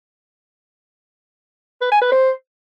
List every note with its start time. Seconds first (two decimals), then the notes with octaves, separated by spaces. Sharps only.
1.81 B4
1.91 G#5
2.01 B4
2.12 C5